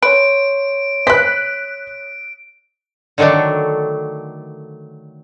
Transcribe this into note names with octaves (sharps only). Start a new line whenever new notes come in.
B4 C#5 C6 D7
B4 C5 F#6 B6
D3 D#3 F#3 A3 D4